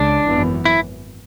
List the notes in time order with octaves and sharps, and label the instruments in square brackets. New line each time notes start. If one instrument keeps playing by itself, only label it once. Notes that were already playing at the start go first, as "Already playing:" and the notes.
Already playing: [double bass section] C#2 C#3 G#3 [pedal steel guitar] D4
[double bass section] G#1 F#2 E3 B3
[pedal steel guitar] E4